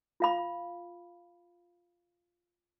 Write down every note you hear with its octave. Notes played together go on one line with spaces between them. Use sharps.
F4 F5 B5